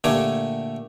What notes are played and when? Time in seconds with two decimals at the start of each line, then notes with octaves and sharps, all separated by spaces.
0.04 A#2 D3 A3 G4 G#5